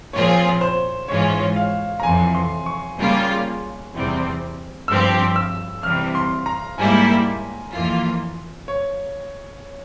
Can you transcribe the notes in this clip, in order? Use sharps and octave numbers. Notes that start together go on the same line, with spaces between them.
A#2 F3 C4 F4 G#4 C#5
C5
G#2 E3 G#3 C#4 F4 C#5
F5
A#5
F2 C3 E3 G#5
C6
C#6
C#3 G3 A#3 F4
E2 C3 G3 C4
G2 F3 C4 G4 E6
E6
C3 E3 G3 F6
C6
A#5
G#2 G3 A#3 E4 G#5
F2 E3 A#3 F4
C#5